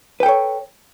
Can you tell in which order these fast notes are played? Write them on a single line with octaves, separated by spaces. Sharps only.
B4 G5 A4 C#5